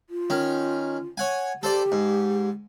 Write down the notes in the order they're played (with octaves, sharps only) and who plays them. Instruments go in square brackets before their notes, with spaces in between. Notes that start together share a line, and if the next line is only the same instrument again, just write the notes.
[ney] F4
[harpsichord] D#3 C#4
C#5 F#5 G#5
[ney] G4 [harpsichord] A4 C5 D5
[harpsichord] G#2